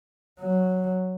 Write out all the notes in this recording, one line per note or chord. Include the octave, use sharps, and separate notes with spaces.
F#3